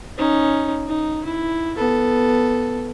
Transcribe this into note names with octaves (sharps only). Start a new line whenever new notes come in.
C#4 D#4
D#4
E4
B3 A4